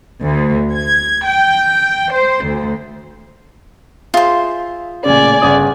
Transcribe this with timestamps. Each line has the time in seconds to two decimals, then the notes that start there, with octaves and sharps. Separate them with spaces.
0.23 D2
0.72 G#6
1.27 G5
2.14 C5
2.45 D2
4.14 F4 G#4 C5 E5
5.05 A1 A#2 C#3 D5 G#5
5.42 G1 C#3 D#6